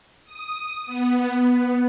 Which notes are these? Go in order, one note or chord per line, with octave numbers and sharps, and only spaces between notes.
D#6
B3